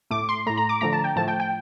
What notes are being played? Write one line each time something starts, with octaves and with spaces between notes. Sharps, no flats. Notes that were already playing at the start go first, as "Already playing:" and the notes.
A2 A3 D6
C6
A2 A3 A#5
A#5
D6
D3 F3 A3 A#5
A5
G5
A2 F3 A3 A5
G5
G5